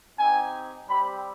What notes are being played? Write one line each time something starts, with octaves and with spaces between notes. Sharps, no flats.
C4 D#4 G4 G#5
G3 C4 G4 B5